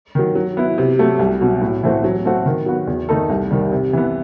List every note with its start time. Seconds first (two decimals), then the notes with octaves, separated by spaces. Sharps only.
0.15 D#3 F#3
0.35 F#3
0.57 B3 E4
0.78 C3
0.99 F#3 A3
1.19 C2
1.41 B2 F#3
1.62 A2
1.83 E3 A3 C4 F#4
2.04 F#3
2.25 A3 C4 F#4 A4
2.46 D#3
2.66 F#3 B3 F#4
2.87 E2
3.09 D#3 A3 D#4 A4
3.30 C2
3.51 C3 D#3 G3
3.72 C3
3.93 E3 B3